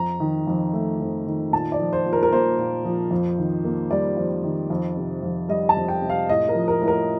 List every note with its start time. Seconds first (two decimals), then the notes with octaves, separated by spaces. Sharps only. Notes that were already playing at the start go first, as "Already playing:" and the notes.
Already playing: F2 A#5
0.20 D#3
0.47 F2
0.73 A3
1.00 F2
1.26 D#3
1.53 A#2 A5
1.72 D5
1.79 F3
1.93 C5
2.06 A#2
2.13 A#4
2.23 A#4
2.31 A#3 C5
2.59 A#2
2.85 F3
3.11 F2
3.38 D#3
3.65 A#3
3.91 G3 D5
4.17 F2
4.43 D#3
4.70 F2
4.97 C3
5.23 F2
5.49 G3 D#5
5.69 A5
5.76 F2
5.88 G5
6.02 C3
6.10 F5
6.29 A2 D#5
6.49 A#4
6.55 F3
6.68 A#4
6.81 A2
6.88 A#4